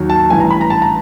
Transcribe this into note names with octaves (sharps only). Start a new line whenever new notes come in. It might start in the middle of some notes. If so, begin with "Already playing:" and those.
Already playing: D#2 D#3 F#3
A5
A1 G2 E3 G#5
A#5
B5
A#5
A5
A#5